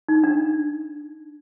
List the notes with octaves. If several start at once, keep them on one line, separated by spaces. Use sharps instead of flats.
D#4
D4